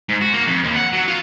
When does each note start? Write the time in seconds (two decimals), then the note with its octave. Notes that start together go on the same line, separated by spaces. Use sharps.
0.09 G#2
0.21 F#4
0.33 A#3
0.47 F2
0.64 D#2
0.76 F#5
0.93 F#3
1.08 F4